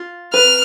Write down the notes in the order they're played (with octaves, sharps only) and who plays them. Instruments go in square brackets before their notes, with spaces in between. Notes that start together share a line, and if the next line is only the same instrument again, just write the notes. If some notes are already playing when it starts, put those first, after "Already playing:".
Already playing: [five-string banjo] F4
[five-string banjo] B4 [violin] F6